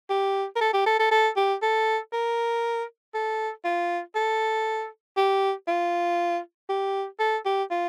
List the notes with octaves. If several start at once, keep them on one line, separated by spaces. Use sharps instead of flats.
G4
A#4
A4
G4
A4
A4
A4
G4
A4
A#4
A4
F4
A4
G4
F4
G4
A4
G4
F4